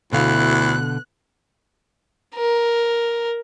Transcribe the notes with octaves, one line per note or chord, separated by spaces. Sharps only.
D2 B2 D3 E4 F5 F#6
A#4